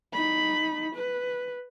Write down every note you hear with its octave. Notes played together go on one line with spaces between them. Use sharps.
D#4 B5
B4